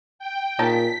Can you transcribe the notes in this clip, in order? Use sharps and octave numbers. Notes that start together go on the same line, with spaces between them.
G5
A#2 C#3 D#4 A5 B6